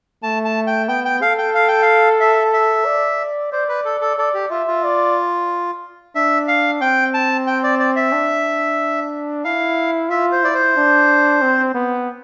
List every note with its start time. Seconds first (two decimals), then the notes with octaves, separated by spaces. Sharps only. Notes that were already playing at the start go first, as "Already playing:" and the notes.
0.23 A3 A5
0.45 A5
0.67 G5
0.88 B3 G5
1.05 G5
1.22 A4 F5
1.38 G5
1.54 F5
1.68 G5
1.82 F5
2.20 E5
2.53 E5
2.86 D5
3.52 C5 D5
3.69 B4
3.85 A4
4.01 A4
4.18 A4 D5
4.34 G4
4.50 F4 E5
4.67 F4
4.84 D5
6.15 D4 E5
6.48 F5
6.81 C4 G5
7.14 A5
7.47 G5
7.63 D5
7.80 D5
7.96 E5
8.13 D4
9.44 E4 F5
10.09 F4 E5
10.32 C5
10.43 E4 D5
10.54 C5
10.76 D4
11.42 C4
11.75 B3